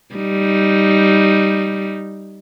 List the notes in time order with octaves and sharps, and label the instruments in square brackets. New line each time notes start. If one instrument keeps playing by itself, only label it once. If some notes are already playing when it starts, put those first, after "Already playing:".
[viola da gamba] G3 D#4